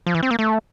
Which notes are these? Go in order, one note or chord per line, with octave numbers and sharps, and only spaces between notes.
F3
E3
C4
A#3
A3